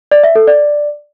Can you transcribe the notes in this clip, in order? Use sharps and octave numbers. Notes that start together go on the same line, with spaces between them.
D5
E5
A4
D5